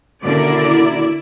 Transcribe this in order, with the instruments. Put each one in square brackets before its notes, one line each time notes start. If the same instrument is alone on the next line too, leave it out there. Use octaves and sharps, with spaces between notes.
[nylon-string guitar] D#2 B2 C#4 [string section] D3 A#4 [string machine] E4 [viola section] D5